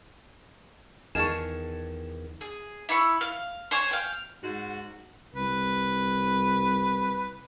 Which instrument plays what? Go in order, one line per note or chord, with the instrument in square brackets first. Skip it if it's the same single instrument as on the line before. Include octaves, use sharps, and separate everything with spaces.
[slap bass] E2 [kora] D#3 G#4 F5 [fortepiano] G#5 A5 C#6 [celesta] E7
[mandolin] G#4
E4 B5 C#6
F5
C5 C#5 G#5 C#6
F5 G5
[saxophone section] G#2 F#4
[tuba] C2 [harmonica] B4